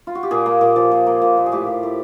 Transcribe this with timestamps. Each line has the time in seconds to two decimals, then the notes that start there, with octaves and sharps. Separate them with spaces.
0.07 F4
0.15 F#4
0.23 G4
0.31 A#2 G#4
0.46 A#3
0.61 A#2
0.76 F3
0.91 A#2
1.06 A#3
1.22 A#2
1.37 A#2
1.46 G#4
1.52 A2 G4
1.67 F3
1.83 A2